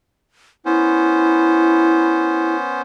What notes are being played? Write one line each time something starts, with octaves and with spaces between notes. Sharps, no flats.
B3 C#4 E4 C5